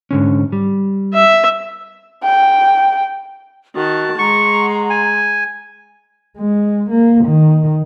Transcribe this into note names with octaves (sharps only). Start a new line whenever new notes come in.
G#2 D3 C#4
G3
E5
G5
D#3 F#4 A5
G#3 F#5 A#5 C6 C#6
G#5
G#3
A#3
D#3